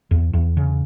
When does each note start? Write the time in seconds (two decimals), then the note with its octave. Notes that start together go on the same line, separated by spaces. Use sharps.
0.11 E2
0.33 E2
0.57 C#3